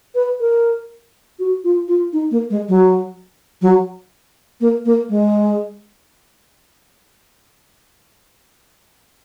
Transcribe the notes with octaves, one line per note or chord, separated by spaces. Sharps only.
B4
A#4
F#4
F4
F4
D#4
A#3
G#3
F#3
F#3
A#3
A#3
G#3